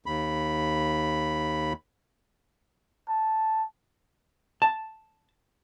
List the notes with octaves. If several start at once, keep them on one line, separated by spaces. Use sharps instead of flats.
D#2 B5
A5
A5